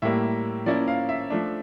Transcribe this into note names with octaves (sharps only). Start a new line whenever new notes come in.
A2 G3 A#3 E5
F3 A#3 C#4 E4 D5
F5
E5
F3 A3 D4